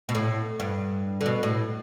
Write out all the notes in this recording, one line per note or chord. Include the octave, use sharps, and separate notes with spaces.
B2
A2
G2
D3
B2
A2